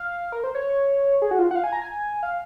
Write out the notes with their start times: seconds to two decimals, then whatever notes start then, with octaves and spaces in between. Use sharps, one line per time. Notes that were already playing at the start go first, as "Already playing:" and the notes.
Already playing: F5
0.32 A#4
0.44 C5
0.55 C#5
1.22 G#4
1.31 F#4
1.39 F4
1.51 F#5
1.56 F5
1.64 G#5
1.72 A#5
1.82 G#5
2.23 F5